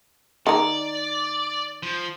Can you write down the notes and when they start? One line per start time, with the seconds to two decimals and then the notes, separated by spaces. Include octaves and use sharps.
0.47 D#3 A#4 D5
1.83 F3